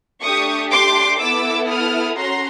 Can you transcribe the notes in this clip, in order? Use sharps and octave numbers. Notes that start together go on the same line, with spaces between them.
A3 D4 G4 C#6 D#6
C6 D6
B3 E4 A4 D6 E6
D#6 F6
C#4 F#4 A4 A#5 C6